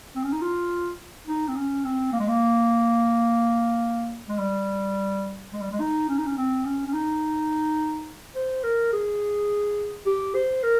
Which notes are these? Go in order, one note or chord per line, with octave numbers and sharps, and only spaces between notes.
C4
C#4
D#4
F4
D#4
C4
C#4
C4
A#3
G#3
A#3
G#3
G3
G#3
G3
G#3
D#4
C#4
D#4
C#4
C4
C#4
C#4
D#4
C5
A#4
G#4
G4
C5
A#4